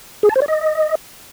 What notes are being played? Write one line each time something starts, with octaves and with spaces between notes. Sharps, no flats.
G#4
A5
C5
D5
D#5